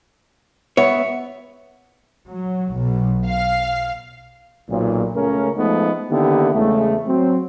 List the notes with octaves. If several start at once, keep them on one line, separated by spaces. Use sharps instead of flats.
B3 C#5 E5
F#3
B1
F5
B1 A#2
C#2 C#3 A3 C#4 A#4
F3 G#3 A3 B3 D#4
D3 D#3 A#3 B3 E4 G4
E2 C#3 G#3 A3
F#3 C4